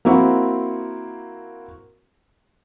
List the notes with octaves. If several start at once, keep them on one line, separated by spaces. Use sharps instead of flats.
A#3 C4 E4 F#4